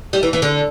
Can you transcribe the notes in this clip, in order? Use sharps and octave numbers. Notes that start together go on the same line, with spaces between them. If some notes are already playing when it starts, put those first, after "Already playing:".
G3
E3
E3
D3